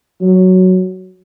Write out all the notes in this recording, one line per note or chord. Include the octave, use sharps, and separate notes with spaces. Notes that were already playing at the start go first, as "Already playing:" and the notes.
F#3